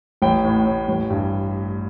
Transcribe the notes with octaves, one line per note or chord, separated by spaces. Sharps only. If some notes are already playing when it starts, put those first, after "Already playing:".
A1 G5
A2
A2
A1
G2